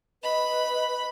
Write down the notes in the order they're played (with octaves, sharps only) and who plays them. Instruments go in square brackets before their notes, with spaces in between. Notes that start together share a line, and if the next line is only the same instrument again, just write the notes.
[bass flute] B4 [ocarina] D#5 [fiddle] B5